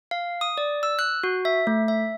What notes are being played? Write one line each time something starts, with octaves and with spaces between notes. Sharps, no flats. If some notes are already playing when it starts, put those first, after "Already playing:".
F5
D#6
D5
E6
F#6
F#4
E5
A3
E5